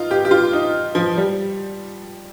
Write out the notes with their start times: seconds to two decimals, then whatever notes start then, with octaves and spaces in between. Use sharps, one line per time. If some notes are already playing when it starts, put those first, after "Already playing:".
Already playing: D#4 F4
0.11 G4
0.25 G4
0.31 F4
0.53 D#4
0.95 F3
1.17 G3